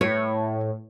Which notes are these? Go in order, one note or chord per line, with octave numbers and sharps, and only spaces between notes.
A2 C#5